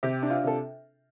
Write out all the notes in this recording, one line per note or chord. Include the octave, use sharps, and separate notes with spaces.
C3 G4
D4
F4
C3 A4